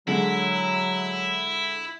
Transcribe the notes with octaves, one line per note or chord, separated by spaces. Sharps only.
D3 F#3 G#3 E4